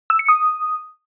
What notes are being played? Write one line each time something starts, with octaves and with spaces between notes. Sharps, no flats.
E6
C#7
D#6